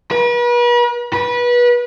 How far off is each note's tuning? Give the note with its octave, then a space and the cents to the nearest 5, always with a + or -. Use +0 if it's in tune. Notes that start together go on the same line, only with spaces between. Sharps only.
B4 -40
B4 -25